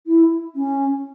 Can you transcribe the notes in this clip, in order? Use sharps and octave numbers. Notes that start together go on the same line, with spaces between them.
E4
C#4